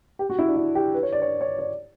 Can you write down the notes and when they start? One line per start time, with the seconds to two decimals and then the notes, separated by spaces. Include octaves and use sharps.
0.19 G4
0.30 F#4
0.39 E4
0.48 D4
0.56 E4
0.75 G4
0.94 B4
1.03 C#5
1.12 D5
1.22 C#5
1.41 C#5
1.59 D5